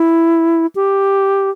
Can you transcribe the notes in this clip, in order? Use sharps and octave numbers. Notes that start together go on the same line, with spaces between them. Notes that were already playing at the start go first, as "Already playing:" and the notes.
Already playing: E4
G4